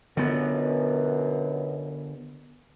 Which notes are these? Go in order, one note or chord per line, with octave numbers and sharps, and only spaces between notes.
F#2 B2 D3 B3